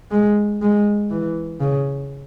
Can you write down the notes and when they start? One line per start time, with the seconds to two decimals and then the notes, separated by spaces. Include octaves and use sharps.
0.11 G#3
0.62 G#3
1.10 E3
1.61 C#3